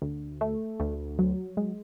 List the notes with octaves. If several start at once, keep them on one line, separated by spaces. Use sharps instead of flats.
D2
A3
D2
F#3
G#3